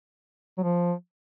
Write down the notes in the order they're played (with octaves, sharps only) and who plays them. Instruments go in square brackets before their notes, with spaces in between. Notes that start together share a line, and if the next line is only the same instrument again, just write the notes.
[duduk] F#3
F3